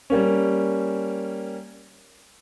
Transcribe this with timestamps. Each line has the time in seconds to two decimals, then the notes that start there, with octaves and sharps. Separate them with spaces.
0.10 G3 A#3 C#4